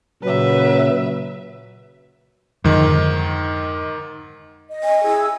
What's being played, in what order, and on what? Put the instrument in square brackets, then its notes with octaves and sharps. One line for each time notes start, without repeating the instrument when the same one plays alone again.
[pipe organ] A#2 C#3 [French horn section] F#3 [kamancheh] B4 E5
[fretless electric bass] F2 D3 [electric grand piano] G#2 D#3
[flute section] D#5
[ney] G#5
[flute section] E4 G#4 E6